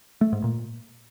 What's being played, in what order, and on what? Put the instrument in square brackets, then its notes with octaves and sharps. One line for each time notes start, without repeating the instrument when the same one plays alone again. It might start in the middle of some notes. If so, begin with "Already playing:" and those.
[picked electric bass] A3
G#2
A#2